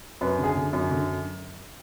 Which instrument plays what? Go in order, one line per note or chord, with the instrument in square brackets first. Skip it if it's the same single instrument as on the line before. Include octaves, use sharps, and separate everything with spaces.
[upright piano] F#2 B4
D3
G#4
D3
F#2
D3